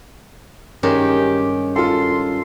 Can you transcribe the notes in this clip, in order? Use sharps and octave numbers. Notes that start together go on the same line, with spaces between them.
G2 D#3 G#3 C#4 G4
F4 A4 C6